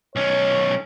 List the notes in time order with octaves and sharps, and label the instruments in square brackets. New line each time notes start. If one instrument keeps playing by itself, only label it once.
[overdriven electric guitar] B1 C#4 [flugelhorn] C#5